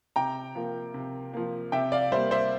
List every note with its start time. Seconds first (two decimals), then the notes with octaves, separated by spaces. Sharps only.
0.16 C3 G5 A#5
0.55 F3 A#3
0.94 C3
1.34 F3 A#3
1.72 C3 E5 G5
1.92 D5 F5
2.12 G3 A#3 C5 E5
2.31 C5 E5